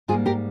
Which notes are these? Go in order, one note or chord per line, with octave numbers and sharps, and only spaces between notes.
G#2 G3 A#3 F4 G#4
G4 A#4